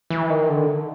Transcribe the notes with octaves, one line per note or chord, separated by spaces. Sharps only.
E3
D#3
D3